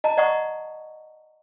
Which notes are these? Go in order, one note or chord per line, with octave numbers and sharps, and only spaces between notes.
D#5 A5 A#5
D5 D#5 F#5 A#5 C#6 D#6